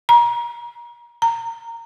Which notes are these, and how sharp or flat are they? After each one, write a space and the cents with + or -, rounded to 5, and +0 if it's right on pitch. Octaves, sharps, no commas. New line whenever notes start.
A#5 +30
A#5 -15